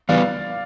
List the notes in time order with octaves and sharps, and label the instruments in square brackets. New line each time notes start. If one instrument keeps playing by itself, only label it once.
[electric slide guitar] E3 G3 B3 [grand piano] D5 F5